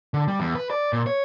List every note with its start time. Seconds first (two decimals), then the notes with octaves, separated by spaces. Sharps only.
0.14 D3
0.28 G3
0.40 E2
0.55 B4
0.70 D5
0.93 A#2
1.07 C#5